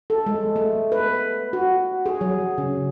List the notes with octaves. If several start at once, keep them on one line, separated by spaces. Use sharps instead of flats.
A4
G#3
A3
B4
F#4
G#4
F#3
C#3